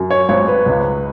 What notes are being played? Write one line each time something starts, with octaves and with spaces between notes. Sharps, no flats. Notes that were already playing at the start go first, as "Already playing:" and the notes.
Already playing: F#2
C#5
G#1 C#5
B4
C#2